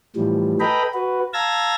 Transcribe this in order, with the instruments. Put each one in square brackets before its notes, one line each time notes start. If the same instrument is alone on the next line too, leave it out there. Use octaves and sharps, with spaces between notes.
[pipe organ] A2 E3 F3 G3
A4 B4 D#5 G5 A#5 B5
F#4 B4
F5 A5 A#5 E6 G#6 A#6